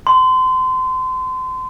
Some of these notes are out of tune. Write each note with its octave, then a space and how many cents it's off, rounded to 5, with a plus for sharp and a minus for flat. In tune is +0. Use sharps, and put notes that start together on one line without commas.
C6 -30